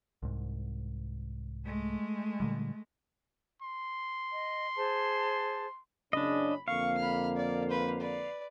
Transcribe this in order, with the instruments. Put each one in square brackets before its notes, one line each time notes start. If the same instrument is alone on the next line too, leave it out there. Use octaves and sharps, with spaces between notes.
[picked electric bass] C2 G#2
[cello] G#3 A3
[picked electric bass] A#2 D3 G3
[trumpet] C6
[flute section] D#5
G#4 C5 A5
[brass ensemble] F#1 C#3 C#4 [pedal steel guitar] D4 D#5 [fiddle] B5
[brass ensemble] F2 D3 A#3 [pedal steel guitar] F5 [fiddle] C#6
[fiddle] B5 F6
D5
B4 C5
B4 D5